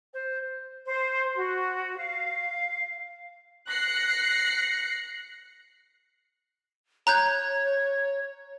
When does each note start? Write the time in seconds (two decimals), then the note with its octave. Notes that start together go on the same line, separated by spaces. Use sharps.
0.13 C5
0.86 C5
1.35 F#4
1.98 F5
3.69 F#6 A#6 C7 C#7
7.07 C#5 A#5 F#6 G6